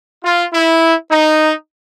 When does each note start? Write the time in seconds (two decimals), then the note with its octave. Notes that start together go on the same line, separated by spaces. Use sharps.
0.24 F4
0.53 E4
1.11 D#4